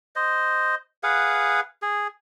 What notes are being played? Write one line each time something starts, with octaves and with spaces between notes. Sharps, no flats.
C5 D#5
G#4 B4 F5 F#5
G#4